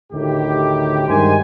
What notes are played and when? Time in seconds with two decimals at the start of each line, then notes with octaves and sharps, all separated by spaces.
0.13 D2 A2 D#3 G4
1.09 G2 D#3 G#3 C5 G#5